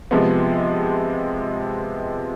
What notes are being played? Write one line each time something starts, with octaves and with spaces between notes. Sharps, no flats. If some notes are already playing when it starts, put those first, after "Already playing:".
C3 F3 G#3 B3